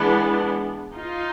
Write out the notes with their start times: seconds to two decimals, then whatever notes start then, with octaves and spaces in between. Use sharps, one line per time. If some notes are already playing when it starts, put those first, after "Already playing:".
Already playing: E3 G#3 B3 D4
0.95 D#4 F4